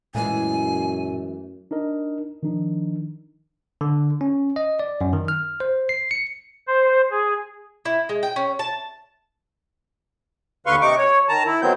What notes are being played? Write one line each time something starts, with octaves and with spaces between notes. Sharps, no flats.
F#2 A#2 E3 G#3 A3 G#5
D4 D#4 A#4 D#5
D#3 F3 D4 D#4
D3
C#4
D#5
D5
F#2
D#3
F6
C5
C7
C#7
C5
G#4
E4
G#3
G5
C#4
A5
D#2 D3 B4 F5 C6 C#6
C3 D#4 C#6 D6
C#5
D#3 A5 A#5
E4
D#3 F#3 B3 C4 G6